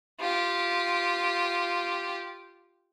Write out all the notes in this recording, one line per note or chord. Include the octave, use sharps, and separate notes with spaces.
F4 G4